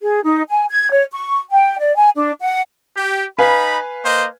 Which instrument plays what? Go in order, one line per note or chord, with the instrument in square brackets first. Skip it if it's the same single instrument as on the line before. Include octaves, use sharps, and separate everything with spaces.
[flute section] G#4
D#4
G#5
G#6
C#5
C#6
G5
D5
G#5
D4
F#5
[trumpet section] G4
[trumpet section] D#4 B5 [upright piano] B4 F5 G#5
[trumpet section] A#3 C5 D#5